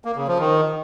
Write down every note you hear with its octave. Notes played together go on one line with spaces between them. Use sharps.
A#3
C#3
F3
D#3